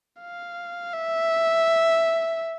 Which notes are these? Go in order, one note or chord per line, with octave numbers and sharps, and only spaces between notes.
F5
E5